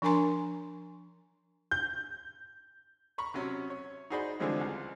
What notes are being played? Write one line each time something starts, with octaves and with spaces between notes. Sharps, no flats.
F3 D4 A#4 G#5 A#5 C6
G6
A#5 B5 C#6
C3 F#3 C#4
C#5
D#4 F#4 G#4 C5 D5 B5
D3 E3 F3 G3 G#3 C4
C#2